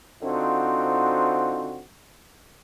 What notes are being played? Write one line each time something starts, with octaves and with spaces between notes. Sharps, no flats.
D3 C4 D#4 F4 F#4 C5